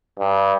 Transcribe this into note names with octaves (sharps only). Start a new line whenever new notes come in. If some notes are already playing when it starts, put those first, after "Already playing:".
G2